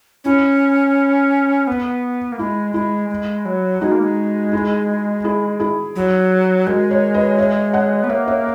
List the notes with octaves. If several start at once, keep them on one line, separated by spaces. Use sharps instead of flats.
C#4 E4
B3
A#3
G#3 E4
G#3 E4
G#3
F#3
G#3 D#4 F#4
A#3
G#3
E4 G#4
E4 G#4
E4 G#4
F#3
G#3 F#4 A#4
A#4 C#5
B4 D#5
C#5 E5
D#5 F#5
B3
A#3 C#5 E5
C#5 E5